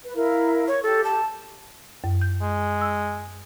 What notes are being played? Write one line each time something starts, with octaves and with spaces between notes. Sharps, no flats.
B4
E4 A#4 F5
C#5
G4 A4
A5
F#2
G6
G#3
E6